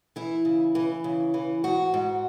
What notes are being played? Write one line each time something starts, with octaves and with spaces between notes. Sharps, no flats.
E3 E4
C#3
E3
C#3
E3
G#2 F#4
G#2